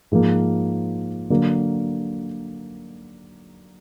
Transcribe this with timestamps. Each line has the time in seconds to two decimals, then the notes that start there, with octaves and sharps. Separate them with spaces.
0.12 G#2 F3 A#3
1.30 D3 F#3 A#3